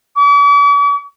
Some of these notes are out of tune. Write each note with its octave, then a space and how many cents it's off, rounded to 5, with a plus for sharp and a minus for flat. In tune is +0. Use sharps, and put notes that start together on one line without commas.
D6 -45